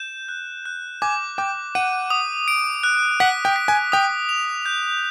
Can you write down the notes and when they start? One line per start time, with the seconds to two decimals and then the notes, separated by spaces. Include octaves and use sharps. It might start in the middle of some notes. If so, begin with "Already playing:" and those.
Already playing: G6 E7
0.29 F#6
0.66 F#6
1.02 G#5 D6
1.38 G5 D6
1.75 F#5 D#7
2.10 D#6
2.48 D7
2.83 F#6
3.20 F#5 B6
3.45 G5
3.56 B6
3.68 G#5
3.92 G5 D#6
4.29 F7
4.66 G6